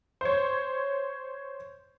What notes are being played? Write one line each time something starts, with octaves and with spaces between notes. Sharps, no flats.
C5 C#5